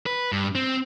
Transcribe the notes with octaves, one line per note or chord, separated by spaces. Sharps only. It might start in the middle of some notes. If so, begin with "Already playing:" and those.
B4
G2
C4